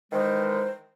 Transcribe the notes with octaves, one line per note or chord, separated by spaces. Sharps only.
D#3 E3 G#3 C5